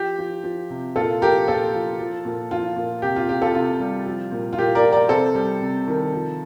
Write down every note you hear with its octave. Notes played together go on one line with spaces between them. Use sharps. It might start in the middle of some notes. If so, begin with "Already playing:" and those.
Already playing: F3 G4
F3
F3
C3
A#2 F4 A4
F3 G4 A#4
A#2 F4 A4
F3
F3
A#2
F3 F4
A#2
C3 G4
F4
C3 G4
F4 A4
C3 F4
G3
F3
A#2
F4
A#2 G4
A#4 D5
F3
A#4 D5
C3 A4 C5
G3
C3
D#3
F3